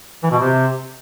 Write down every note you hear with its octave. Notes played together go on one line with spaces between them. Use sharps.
E3
B2
C3